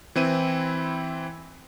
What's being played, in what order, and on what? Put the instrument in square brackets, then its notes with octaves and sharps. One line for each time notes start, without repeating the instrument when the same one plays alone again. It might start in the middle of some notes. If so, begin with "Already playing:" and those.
[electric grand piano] E3 C4 E4 D#7